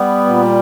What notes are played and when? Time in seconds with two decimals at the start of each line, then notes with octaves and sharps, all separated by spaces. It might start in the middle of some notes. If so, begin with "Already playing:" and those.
Already playing: G3 B3
0.26 A#2